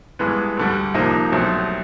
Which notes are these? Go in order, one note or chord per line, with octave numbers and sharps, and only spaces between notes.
G2 E3 G#3 B3
D2 D3 G3
C2 C3 F3 A#3 D#4
C2 B2 F#3 A3 C4